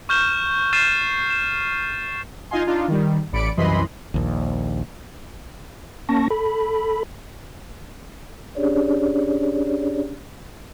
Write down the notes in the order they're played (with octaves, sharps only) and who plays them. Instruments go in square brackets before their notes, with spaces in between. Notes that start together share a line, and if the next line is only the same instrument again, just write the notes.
[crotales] C#6 F6 G6 E7 G7
F6 G6 A6 C7 D#7 E7
E7
[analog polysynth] D#4 F4 D#5 F5 G#5 C6
D4 D#4 F4
D#3 G3
A1 D5 B5 C#7 D7
C2 F#2 E3 D#5 B5 C6
[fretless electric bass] A#1 D#2
[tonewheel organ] A#3 C#4 A5 C#6 A#6
A4 B5
[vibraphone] C#4 D4 G4 G#4 C#5 D5